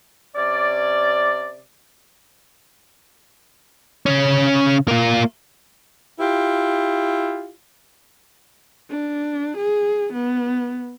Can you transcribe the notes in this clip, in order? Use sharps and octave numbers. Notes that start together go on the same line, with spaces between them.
C3 C#4 D5
C#3 C#4
A#3 F4
E4 F4 G4
D4
G#4
B3